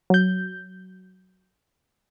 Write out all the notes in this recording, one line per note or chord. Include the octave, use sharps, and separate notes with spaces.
F#3 G6